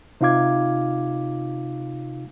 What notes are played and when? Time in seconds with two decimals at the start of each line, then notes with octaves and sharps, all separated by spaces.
0.21 C3 D#4 F4 F5 D6 G#6